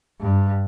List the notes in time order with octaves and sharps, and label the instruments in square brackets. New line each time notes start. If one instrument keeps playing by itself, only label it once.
[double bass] G2